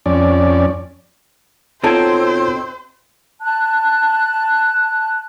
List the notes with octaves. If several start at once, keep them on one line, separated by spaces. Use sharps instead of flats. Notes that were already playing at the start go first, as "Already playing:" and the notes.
F2 C#4 D5
B2 C4 D#4 F4 A4 C5 C#5 G#6
A5 F#6